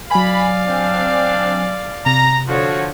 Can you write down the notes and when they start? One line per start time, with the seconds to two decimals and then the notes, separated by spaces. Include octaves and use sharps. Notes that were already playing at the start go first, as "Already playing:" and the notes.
0.11 F#3 D5 F5 G#5 B5
0.67 C4 D4
2.06 C3 A#5
2.48 D3 F3 F#4 C#5